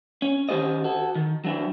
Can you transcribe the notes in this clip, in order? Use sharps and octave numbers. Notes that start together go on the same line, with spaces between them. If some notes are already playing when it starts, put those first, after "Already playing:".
C#4
D#3 C#4 D#4 G4 C5 D#5
F#4 A4
D#3
F#3 D4 E4